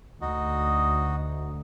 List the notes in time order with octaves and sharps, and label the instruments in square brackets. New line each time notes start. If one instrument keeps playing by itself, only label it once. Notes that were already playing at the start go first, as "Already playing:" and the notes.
[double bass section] D2 [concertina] D#4 F#4 D#5